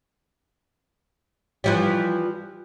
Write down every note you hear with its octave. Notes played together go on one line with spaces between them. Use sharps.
E3 F3 G3